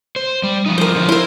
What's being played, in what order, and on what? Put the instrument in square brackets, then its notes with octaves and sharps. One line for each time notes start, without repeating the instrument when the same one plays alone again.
[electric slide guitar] C5
G3
F3 D#4
[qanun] A#4 C5
[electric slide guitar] D3 F3
[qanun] E4 A#4 [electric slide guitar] C5